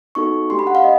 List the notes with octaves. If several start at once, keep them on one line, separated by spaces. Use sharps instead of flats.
B3 D#4 F#4 A4 C#6
A3 D4 G4 C6
B5
F#5
F5
D#5